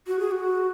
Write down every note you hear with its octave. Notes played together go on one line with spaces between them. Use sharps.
F#4
G#4
F#4